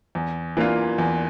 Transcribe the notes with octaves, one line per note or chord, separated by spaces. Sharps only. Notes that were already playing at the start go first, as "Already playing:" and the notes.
E2
E3 A#3 D4 F4
E2